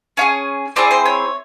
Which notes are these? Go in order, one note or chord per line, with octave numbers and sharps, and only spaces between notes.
C#4 F4 G#4
C4 E4 G#4 D5
C5
C#5